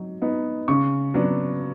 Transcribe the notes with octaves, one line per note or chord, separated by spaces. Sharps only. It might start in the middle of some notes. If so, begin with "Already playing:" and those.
Already playing: F#3 D#4
B3 D#4
C#3 C#6
F#3 B3 D4